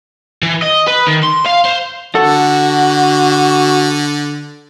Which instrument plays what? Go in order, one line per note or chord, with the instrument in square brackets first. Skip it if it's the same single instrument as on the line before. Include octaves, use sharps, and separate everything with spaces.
[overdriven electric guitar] E3
D#5
B4
D#3
C6
F5
C5
[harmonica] D3 [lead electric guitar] F#4 [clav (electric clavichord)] A4